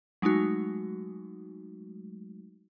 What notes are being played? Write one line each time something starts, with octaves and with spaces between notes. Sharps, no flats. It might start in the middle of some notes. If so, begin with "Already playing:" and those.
F#3 G#3 A3 D#4 F#4